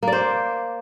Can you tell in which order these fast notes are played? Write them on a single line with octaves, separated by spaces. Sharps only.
A#3 D5 C5